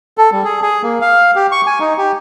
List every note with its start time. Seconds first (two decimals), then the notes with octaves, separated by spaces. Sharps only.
0.18 A4
0.32 G3
0.44 G#4
0.62 G#4
0.83 A#3
1.01 F5
1.36 G4
1.52 C#6
1.67 G#5
1.80 D#4
1.98 G4